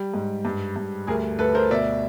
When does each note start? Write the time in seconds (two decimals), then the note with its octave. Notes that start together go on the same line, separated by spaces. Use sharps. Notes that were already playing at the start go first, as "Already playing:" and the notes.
Already playing: G3
0.14 G#2
0.45 G2
0.76 G2
1.07 D2 G#4 A#4
1.39 D2 A4 B4
1.55 A#4 C5
1.71 B2 D5 E5